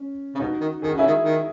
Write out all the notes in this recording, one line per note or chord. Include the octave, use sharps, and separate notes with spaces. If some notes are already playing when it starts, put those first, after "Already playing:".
Already playing: C#4
C#3
B2 D#4 F#4
D#3
D#3 G#4
F#4
C#3 E4 G#4
D#3
D#3